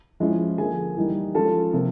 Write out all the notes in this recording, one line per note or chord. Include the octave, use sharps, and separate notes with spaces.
F3 G#3 C#4 E4
D3 F3 A#3 G#4 G#5
E3 G3 A#3 D#4
F3 G#3 C#4 F4 A4 A5
C3 F3 A#3